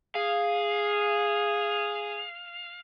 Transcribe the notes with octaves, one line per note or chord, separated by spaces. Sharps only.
G#4 F5